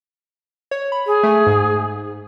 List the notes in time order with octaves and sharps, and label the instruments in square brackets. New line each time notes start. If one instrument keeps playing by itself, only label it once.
[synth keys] C#5
B5
[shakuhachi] G#4
[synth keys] A3 G#5
G#2